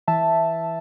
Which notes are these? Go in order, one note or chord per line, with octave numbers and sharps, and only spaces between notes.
E3 E5 A5